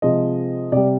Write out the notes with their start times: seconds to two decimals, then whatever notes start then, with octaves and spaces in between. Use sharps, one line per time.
0.02 C3 F3 G#3 D#5
0.72 C3 G3 D5